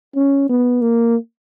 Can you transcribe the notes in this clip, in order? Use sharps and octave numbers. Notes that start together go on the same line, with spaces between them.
C#4
B3
A#3